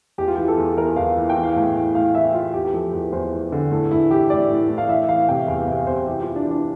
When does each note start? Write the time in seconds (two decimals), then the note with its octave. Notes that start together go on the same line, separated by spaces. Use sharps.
0.18 E2 G4
0.28 F4
0.36 E3 G4
0.48 A4
0.58 E2
0.77 E3 A#4
0.96 E2 F5
1.17 E3
1.30 G5
1.36 E3
1.44 F5
1.56 A2 G5
1.76 E3
1.95 A2 F5
2.15 E3 E5
2.34 E3 F4
2.53 E2 G4
2.65 G4
2.73 F3 A4
2.93 E2
3.12 E2 C5
3.32 E2
3.52 D3
3.71 A2 A4
3.91 A2 E4
4.10 E3 G4
4.30 A2 D5
4.50 A2
4.69 A2
4.78 F5
4.89 E3 E5
5.08 E3 F5
5.29 C3 G5
5.48 E2 F5
5.68 C3 F5
5.87 C3 C5
6.07 E3 G4
6.21 F4
6.27 E3
6.36 D4
6.46 E3 D4